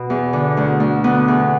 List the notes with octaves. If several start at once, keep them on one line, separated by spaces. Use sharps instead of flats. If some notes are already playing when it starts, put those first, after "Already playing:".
Already playing: B2
E2
D3
D2
D2
D3 B3
E2